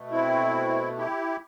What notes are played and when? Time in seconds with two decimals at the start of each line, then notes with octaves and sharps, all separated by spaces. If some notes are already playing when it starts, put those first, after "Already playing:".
Already playing: B2 A3
0.11 C4 E4
0.98 E4 G4